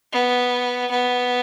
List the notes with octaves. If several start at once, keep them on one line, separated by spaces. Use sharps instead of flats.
B3
B3